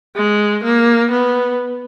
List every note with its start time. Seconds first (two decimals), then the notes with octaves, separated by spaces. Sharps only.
0.16 G#3
0.64 A#3
1.11 B3